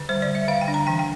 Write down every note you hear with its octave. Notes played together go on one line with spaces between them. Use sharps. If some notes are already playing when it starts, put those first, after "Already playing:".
Already playing: D3
G3 C5
D5
G3
E5
D3 F5
G5
D4
A#5
E3 G5
G5